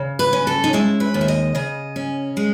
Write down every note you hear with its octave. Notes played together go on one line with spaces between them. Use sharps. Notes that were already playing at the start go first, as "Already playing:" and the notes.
Already playing: C#3
B4
C#4
A4
D#4
G#3 E4
B4
D#2
E5
D#5
C#3 D#5
C#4
G#3